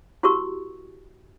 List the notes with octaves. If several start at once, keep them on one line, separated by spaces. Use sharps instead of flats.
E4 F#4 G4 A#4 C#6 E6